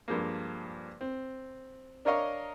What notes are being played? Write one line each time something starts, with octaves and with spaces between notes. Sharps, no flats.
G2 F3 G#3 A#3
C4
D4 A#4 C#5 D#5 F5 C#6